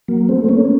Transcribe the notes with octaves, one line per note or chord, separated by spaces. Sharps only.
F#3 A#3
A3 C4
C4
A#3 C#4